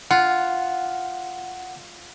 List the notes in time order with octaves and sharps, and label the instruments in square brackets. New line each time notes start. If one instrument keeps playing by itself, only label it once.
[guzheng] F4 [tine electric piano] F#5